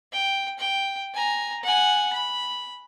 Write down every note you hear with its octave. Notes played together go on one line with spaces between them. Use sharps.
G5
G5
G#5 A#5
F#5 G#5
B5